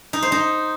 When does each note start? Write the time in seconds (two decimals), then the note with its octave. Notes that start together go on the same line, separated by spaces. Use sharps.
0.13 D#4
0.22 C5
0.32 D#4